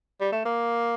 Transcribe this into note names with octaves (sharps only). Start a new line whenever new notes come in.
G3
A3
A#3